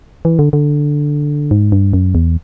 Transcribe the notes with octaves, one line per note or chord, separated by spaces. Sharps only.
E3
D3
D3
G#2
G2
F#2
E2